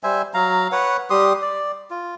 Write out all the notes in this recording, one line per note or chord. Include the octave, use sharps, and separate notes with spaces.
G3 C5 E5 G#5
F#3 F5 A#5
B4 C#5 F#5
G3 G4 C6 D#6
D5
F4